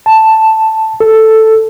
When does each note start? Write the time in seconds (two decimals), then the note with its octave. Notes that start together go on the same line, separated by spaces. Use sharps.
0.06 A5
1.00 A4